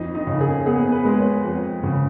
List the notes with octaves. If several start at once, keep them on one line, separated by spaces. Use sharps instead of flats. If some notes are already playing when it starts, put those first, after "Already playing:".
Already playing: F2 D#4
D#4
C#3
G#4
B3 G#4
B4
G#3
C#5
F2
C#3